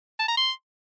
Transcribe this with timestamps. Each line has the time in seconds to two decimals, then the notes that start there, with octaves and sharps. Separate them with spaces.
0.19 A5
0.28 A#5
0.37 C6